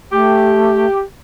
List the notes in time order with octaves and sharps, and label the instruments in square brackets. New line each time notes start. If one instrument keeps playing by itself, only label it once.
[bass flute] A3 [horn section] G4